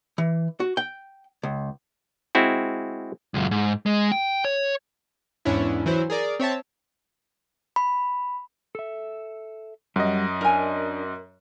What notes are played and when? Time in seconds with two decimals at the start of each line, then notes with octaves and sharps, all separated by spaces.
0.18 E3
0.60 F#4
0.77 G5
1.43 C#2
2.35 G#3 C4 E4 F#4
3.34 C#2 F#2
3.51 G#2
3.86 G#3
4.12 G5
4.45 C#5
5.45 E2 G#2 C#4 D4 E4
5.86 E3 F#3 E4 C5
6.10 G#4 A#4 D5
6.40 C4 C#5 E5 A5
7.76 B5
8.75 A4 E5
9.96 F#2 G3 D#5 F#5
10.41 D4 A#4 G#5